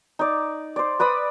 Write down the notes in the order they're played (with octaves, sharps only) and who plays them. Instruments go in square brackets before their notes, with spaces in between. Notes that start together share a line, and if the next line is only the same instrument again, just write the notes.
[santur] D#4 D5
C5 D5
B4 D5 B5 D#6